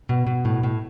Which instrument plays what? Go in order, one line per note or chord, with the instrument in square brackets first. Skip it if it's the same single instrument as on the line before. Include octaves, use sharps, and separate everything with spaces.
[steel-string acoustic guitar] B2
B2
A2
A2